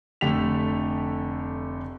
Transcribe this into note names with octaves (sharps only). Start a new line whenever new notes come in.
F1 D3 A3 G4 B6 F7